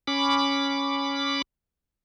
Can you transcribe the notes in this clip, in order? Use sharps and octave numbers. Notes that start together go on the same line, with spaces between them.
C#4 B5 D6